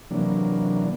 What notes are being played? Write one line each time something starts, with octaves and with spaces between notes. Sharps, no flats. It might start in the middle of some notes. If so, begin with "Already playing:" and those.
C3 E3 F#3 A#3 D4